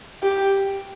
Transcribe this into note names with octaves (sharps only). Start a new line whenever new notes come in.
G4